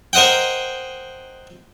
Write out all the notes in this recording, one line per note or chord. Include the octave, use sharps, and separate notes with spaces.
A#4 C5 D#5 F#5 G5